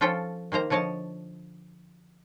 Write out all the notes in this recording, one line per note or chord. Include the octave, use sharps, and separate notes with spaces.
F3 C#4 F4 A4 G5
D#3 A#3 C5 A#5
D3 F3 C#5 D#5 A5